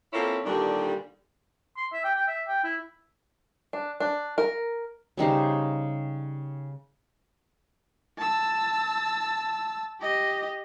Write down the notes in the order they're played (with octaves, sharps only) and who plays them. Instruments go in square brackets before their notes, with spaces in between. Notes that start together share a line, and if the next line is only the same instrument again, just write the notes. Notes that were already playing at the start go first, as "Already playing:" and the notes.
[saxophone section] A#3 C4 C#4 E4 F4 A4
G2 A#2 D3 D#3 G3
[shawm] C6
E5
G5
G5
E5
G5
E4
[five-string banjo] D4
D4
A#4
[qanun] C#3 G3 D#4 C5
[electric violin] A5 E6
G4 D#5